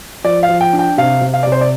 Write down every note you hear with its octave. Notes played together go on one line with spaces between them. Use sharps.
F3 D5
F5
F3
G5
D4
G5
C3 F5
C3
F5
C3 D5
C5
D5